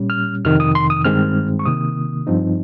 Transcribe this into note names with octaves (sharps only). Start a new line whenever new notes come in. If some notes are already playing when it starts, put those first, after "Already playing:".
Already playing: A#2 G3 C#4
F6
F2 C3 D#3 F6
D#6
C6
D#6
G2 D#3 G#3 C4 F6
C#6
C3 D#3 A#3 D#6
G2 F3 C4 D#4